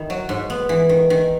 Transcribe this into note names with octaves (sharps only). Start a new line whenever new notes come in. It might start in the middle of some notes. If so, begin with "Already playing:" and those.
Already playing: D#3 E4
F#3
G#2
B3
E3
D#3
D#3